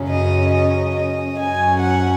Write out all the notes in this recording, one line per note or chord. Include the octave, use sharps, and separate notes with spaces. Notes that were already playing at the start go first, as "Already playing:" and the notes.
Already playing: F#2 C#3 F#3 C#4
D#5
D#5
D#5
F#2 F#3 C#4 G#5
F#5